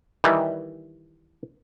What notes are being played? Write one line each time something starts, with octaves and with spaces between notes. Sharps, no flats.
D#3 E3 G3